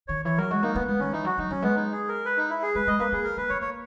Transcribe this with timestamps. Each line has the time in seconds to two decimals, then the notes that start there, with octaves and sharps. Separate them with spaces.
0.08 D#3 C#5
0.25 E3 C#5
0.38 F#3 A#4
0.50 G#3 F#4
0.63 A#3 D#4
0.75 A#3 B3
0.87 G#3 B3
0.99 D#3 C#4
1.13 E3 D#4
1.25 F#3 F#4
1.38 F#3 D#4
1.50 F#3 C#4
1.62 G#3 B3
1.75 D#4
1.92 G#4
2.08 A#4
2.25 B4
2.37 D#4
2.50 E4
2.62 G#4
2.75 G#3 B4
2.87 G#3 D#5
2.99 A#3 B4
3.12 A#3 G#4
3.24 A#4
3.37 A#3 B4
3.49 B3 C#5
3.61 A#3 C#5